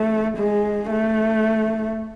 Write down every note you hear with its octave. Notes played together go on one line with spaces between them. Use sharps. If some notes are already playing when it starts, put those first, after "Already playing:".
Already playing: A3
G#3
A3